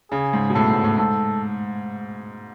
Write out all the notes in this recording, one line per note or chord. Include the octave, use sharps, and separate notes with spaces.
C#3 G#4
G#2
B2
A2 A4
G#2
A2
G#2 A4